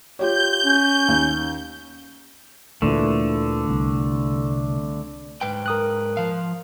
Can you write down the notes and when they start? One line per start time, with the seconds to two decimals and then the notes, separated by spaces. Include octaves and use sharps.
0.19 F4 G4 C#5 G6
0.65 C#4
1.08 D#2
2.82 D2 A#2 D3 E3 A3
3.69 C2
5.41 G#2 B4 G5
5.66 A#4 D#6 F#6
6.17 F3 F5